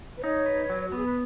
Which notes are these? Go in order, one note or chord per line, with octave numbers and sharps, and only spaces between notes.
B4
D#4 C#5
B4
F#3
F#4
B3 G#4
B4